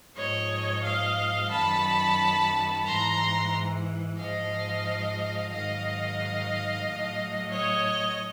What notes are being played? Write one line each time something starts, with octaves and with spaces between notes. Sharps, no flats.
G#2 F3 C#5 D#5
D#5 F5
F#2 D#3 F#3 A5 B5
G#2 E3 A#5 C6
G#2 F3 D#5 F5
G#2 D#3 F#3 D#5 F5
A2 F#3
C#5 D#5